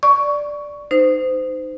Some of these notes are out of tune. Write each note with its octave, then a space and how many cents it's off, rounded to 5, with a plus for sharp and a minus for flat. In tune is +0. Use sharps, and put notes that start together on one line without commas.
D5 +0 C#6 +10
D#4 -15 C5 -25